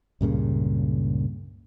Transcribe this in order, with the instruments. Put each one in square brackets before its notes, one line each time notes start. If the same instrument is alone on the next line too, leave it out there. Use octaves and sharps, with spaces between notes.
[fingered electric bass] C#2 G2 A#2 C#3